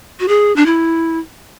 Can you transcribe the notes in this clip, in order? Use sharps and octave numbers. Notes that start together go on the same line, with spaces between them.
F#4
G#4
D4
E4